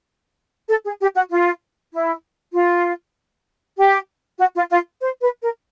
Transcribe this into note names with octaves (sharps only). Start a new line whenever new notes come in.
A4
G#4
G4
F#4
F4
E4
F4
G4
F#4
F4
F4
C5
B4
A#4